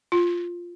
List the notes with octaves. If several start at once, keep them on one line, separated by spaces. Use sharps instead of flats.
F4